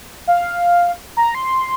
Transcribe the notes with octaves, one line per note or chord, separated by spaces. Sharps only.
F5
A#5
C6